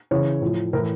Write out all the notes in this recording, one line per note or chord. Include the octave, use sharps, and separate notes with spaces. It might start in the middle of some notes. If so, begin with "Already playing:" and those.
C#3 E3 C#5
A2 F3
A2 E3 A#4